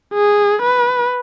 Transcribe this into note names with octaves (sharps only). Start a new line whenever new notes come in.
G#4
B4